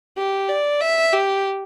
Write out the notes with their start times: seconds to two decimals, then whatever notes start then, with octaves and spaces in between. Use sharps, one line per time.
0.17 G4
0.49 D5
0.81 E5
1.13 G4